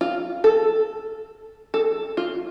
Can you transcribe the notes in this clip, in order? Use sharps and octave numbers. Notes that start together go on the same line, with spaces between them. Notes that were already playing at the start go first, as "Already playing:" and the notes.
F4
A4
A4
F4